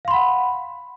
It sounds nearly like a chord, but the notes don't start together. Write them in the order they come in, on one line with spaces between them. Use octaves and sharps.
F5 C6 B5 F#5